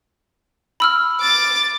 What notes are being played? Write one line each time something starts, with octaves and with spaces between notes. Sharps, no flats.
B5 E6 F6
D6 A6